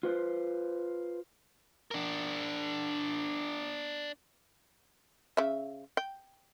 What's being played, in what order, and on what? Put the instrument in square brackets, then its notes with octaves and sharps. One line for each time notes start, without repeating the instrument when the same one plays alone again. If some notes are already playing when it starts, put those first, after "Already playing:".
[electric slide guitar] F4 B4 C5
[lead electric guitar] D4 A#4
[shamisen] C#3 E5
G5